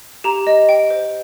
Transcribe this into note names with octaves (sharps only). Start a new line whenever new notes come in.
G4 A#5
D#5
G5
C5